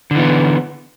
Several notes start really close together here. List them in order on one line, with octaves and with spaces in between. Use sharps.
D3 E3 B3